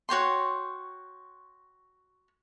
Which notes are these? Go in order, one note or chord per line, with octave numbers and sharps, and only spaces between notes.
F#4 C#5 G5 C6